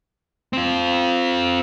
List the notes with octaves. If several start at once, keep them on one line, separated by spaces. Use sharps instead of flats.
C4 F4